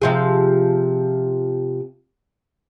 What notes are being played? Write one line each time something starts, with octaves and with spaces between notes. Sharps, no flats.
C3 F3 G#4